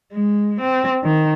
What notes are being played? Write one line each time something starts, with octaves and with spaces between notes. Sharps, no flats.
G#3
C4
D#3